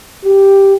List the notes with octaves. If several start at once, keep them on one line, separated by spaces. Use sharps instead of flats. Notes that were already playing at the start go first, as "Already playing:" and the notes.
G4